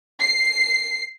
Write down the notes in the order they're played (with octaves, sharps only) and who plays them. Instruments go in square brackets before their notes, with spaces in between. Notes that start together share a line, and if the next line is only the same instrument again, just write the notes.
[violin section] C7